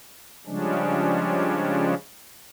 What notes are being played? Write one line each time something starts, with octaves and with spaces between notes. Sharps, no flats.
C#3 F3 G3 G#3 C#4 D4